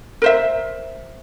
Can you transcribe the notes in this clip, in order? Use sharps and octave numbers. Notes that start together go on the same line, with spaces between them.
A#4 C5 E5